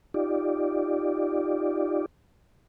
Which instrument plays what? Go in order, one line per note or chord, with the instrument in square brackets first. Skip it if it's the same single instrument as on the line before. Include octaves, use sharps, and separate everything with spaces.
[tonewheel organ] D#4 F4 G4 D5